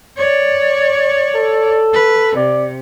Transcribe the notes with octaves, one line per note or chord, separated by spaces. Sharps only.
C#5 D5
A4
B4
C3 D5